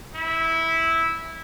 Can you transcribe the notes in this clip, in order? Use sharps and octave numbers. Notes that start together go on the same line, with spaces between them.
E4